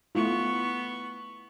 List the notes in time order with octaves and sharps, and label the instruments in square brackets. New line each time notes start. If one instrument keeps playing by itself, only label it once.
[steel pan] A3 E4 F4 [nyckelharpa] B3 C#6